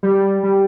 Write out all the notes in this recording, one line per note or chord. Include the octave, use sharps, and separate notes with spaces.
G3
G3